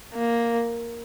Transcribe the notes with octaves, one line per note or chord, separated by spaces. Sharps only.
A#3